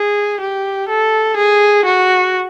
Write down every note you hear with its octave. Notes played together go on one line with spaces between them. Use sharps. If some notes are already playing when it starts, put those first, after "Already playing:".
Already playing: G#4
G4
A4
G#4
F#4